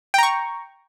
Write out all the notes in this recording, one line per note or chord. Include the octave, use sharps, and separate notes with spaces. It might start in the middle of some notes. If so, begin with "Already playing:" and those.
G5 A#5 C#6